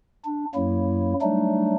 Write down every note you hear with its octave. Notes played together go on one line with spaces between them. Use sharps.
D4
F#2 F#3 A#3 E4
F#3 G3 A3 D4 D#4